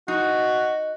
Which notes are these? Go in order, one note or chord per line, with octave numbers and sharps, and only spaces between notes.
D#4 F#4